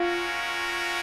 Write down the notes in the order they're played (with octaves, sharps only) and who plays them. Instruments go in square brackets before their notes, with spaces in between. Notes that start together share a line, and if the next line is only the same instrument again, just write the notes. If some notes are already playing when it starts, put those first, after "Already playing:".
Already playing: [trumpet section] G#3 C#4 F#4 A#4 [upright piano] F4